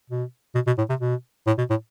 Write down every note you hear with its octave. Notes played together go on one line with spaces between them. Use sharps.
B2
B2
B2
A2
C3
B2
A2
B2
A2